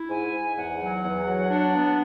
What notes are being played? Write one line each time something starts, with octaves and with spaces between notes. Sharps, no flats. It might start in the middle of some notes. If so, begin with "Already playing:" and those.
Already playing: E4
G#2 G#5
G#2
E2 F#5
F#3
E2
F#3
D4
B3